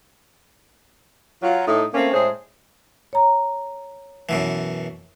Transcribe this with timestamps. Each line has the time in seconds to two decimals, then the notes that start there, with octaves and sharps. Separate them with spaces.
1.42 F#3 F4
1.67 A2 D#4
1.94 A3 A#3 C4 C#4
2.13 A2 G#3 G#4 C5 C#5
3.13 C#5 A#5
4.29 F#2 B2 E3